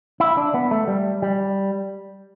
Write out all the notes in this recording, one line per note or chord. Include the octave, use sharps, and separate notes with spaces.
E4
D4
B3
A3
G3
G3